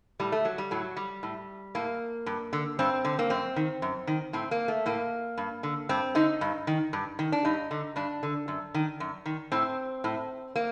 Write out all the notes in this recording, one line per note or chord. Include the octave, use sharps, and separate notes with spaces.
A2 G3
A3
F#3
G3
A2 F#3
G3
A2
A2 A#3
G2
D3
G2 C4
D3
A#3
F#2 C4
D#3
F#2
D#3
A2 C4
A#3
A3
A2 A#3
G2
D3
G2 C4
D3 D#4
G2
D#3
G2
D#3
D4
G2 D#4
D3
G2 D4
D3
F#2
D#3
F#2
D#3
A2 C4
A2
A#3